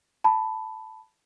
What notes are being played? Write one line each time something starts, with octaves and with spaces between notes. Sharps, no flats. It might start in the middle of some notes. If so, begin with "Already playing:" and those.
A5 B5